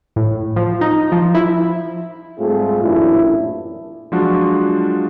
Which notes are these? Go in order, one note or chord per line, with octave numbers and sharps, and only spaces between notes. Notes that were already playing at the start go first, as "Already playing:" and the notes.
A2
F3
D#4
F3
E4
G#2 G3 A3 C4 F4 G#4
A1 F#2 A#2 D4 E4
F3 F#3 G#3 D4 F4 F#4